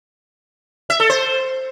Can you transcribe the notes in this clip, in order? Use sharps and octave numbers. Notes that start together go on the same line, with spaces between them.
E5
A4
C5